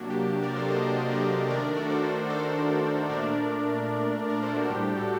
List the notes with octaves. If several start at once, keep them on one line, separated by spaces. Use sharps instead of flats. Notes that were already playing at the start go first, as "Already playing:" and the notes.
Already playing: C3 F#3 A#3 D4 F#4
G4
A#4 D5
A4 C5
C5 D#5
A#4 D5
D#3 A3 D4 A#4 D5
F#4 A4
A4 C5
A4 C5
A#2 A3 D4 A#4 D5
A#4 D5
A4 C5
F#4
A2 G3 D4 G4
F#4 A4